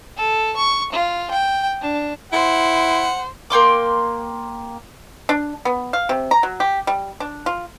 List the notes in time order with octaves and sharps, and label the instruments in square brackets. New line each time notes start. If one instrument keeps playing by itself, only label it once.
[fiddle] A4
C#6
F4
G5
D4
[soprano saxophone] E4 [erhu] C5 [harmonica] F#5
[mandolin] A#3 G5 C6 D6
[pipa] D4
B3
F5
C3
A#5
F#3
G4
G3
D4
F4